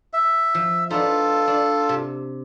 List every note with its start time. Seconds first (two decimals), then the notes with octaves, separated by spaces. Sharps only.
0.13 E5
0.55 F3
0.90 B3 D4 D#4 F4 A4
1.47 D4
1.89 C3